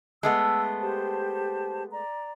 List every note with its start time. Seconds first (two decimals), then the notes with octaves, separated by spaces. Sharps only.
0.23 G#3 A3 B3 E6
0.80 G4 C5 A5
1.92 D5 A#5